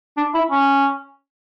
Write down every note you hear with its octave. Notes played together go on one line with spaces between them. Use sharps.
D4
E4
C#4